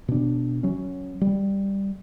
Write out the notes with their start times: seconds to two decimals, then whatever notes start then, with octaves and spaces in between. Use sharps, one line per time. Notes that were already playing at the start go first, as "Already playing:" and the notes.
0.08 B2 D4
0.63 F#3 C#4
1.21 G3